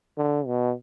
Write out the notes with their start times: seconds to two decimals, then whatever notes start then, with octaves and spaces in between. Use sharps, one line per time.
0.18 D3
0.47 B2